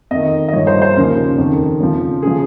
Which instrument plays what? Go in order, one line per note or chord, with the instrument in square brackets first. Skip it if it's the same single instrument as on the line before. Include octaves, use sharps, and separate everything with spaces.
[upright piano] F2 D#3 D#5
D#5
G2 F3 C#5
C5
C5
D#2 C#3 F3 A#4
F2 D#3
F2 C#3 F3
C#3 F3 G#4